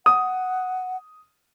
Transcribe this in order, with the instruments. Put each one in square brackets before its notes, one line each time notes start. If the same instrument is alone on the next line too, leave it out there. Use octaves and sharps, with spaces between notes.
[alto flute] F#5 [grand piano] D#6